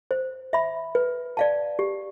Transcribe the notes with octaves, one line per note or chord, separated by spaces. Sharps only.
C5
E5 B5
B4
D5 F5 A5
G4